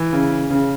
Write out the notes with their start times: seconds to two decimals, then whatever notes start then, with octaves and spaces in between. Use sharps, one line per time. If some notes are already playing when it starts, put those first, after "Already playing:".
Already playing: E3
0.13 C#3
0.50 C#3